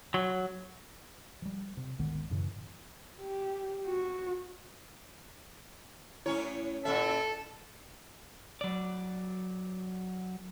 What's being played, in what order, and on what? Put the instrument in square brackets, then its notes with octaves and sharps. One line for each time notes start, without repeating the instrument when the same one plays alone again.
[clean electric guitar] F#3
[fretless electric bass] F3 G3
C3
G#1 D2 D#3 B3
F#2 A2 C#3 E3
[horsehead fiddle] G4
F#4
[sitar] A2 C#4 C#5 [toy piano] E4
[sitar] A#2 C#4 E5 [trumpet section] A4
[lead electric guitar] F#3 D5